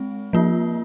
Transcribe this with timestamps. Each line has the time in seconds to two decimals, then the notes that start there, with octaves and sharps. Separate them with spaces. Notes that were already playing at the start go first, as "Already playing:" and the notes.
Already playing: G#3 C4
0.33 F3 A#3 F4